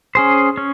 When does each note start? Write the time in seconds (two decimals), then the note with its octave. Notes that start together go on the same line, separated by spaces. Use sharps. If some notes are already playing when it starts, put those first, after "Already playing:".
0.15 C#4 G#4 C5
0.57 C#4